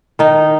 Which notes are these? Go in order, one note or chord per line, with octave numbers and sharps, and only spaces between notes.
D#3 D#4